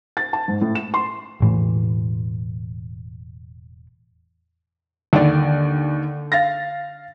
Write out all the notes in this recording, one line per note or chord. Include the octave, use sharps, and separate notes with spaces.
A6
A5
G#2
A2
E7
C6
E1 A2 E3
D#2 D3 D5
F5 A6 A#6